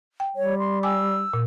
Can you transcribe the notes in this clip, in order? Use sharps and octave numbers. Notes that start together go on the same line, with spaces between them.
G5
G3 C#5
C6
G5 G#5 D6 E6
A#2